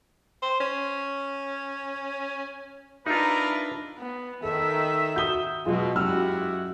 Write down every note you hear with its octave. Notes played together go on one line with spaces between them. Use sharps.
C5
C#4
D4 D#4 F4 A#4 B4 E5 F5 A#5
B3
D#3 A4 E5
F#4 D#6 G6 G7
B2 F#3 G#3 F4
F#2 G#3 E4 F#4 G4 E6 F6